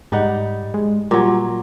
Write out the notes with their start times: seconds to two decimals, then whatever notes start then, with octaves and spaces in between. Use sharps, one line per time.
0.12 G#2 G3 D#4 F#5
0.74 G#3
1.11 A#2 F#3 G3